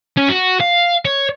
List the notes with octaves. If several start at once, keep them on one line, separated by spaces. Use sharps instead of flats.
C#4
F#4
F5
C#5